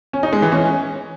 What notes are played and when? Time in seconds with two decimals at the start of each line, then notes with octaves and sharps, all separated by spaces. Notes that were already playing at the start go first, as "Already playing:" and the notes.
0.13 C#4
0.23 D#4
0.33 G#3
0.42 E3
0.52 C#4